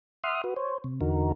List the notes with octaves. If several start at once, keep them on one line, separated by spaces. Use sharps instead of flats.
E5 F#5 C6 D#6 F6
F#4 B4
C5 C#5
C3
E2 D3 D#4 F#4 A#4